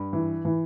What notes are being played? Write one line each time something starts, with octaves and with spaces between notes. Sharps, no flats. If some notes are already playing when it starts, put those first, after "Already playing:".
Already playing: G2
E3
E3